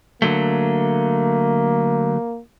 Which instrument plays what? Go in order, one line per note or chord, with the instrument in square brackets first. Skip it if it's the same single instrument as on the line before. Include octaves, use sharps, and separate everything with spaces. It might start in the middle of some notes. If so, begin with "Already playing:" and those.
[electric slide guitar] D3 F#3 A3 [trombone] A#3